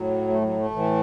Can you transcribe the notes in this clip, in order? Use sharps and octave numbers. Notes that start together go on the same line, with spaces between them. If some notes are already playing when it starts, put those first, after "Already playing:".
Already playing: A2 F#3
A3
F#3
A3
A2 E3